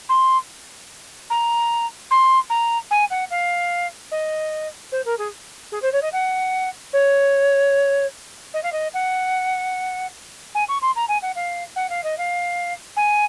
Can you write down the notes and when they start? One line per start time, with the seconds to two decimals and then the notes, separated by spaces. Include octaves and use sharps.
0.09 C6
1.30 A#5
2.11 C6
2.50 A#5
2.91 G#5
3.10 F#5
3.31 F5
4.11 D#5
4.92 C5
5.05 A#4
5.18 G#4
5.72 G#4
5.82 C5
5.93 C#5
6.02 D#5
6.13 F#5
6.93 C#5
8.54 D#5
8.63 F5
8.72 D#5
8.94 F#5
10.55 G#5
10.69 C#6
10.82 C6
10.96 A#5
11.09 G#5
11.22 F#5
11.36 F5
11.76 F#5
11.90 F5
12.04 D#5
12.18 F5
12.96 G#5